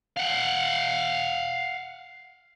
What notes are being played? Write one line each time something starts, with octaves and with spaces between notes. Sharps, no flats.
F5 F#5